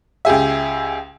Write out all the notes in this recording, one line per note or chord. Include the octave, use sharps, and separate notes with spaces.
C#2 G4 G#4 E5